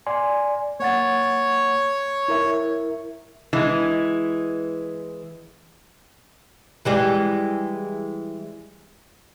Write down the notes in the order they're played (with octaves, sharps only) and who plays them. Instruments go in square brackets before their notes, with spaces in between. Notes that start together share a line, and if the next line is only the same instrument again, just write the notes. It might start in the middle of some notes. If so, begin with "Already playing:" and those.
[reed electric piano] D5 G#5 C6
[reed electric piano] A#3 F#5 A6 [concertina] C#5
[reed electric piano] E4 A#4 E5
[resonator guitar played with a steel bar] E3 G#3
[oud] E3 G3 G#3